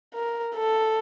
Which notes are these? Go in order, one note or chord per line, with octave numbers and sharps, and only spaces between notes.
A#4
A4